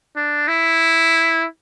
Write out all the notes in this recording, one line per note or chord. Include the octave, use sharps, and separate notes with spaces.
D4
E4